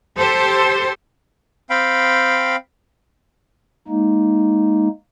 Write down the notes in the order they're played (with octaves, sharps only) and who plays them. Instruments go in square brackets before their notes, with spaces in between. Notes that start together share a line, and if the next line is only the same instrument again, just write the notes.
[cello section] G4 A4 C5
[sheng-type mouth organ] C4 F5 G5 B5
[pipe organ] G#3 A#3 D#4